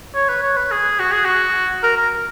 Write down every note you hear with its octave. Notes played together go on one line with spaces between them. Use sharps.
C#5
B4
C#5
B4
G#4
F#4
G#4
F#4
A#4
A#4